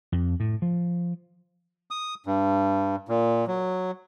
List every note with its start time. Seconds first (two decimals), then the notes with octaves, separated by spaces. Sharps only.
0.12 F2
0.40 A2
0.62 F3
1.91 D#6
2.26 G2
3.09 A#2
3.47 F#3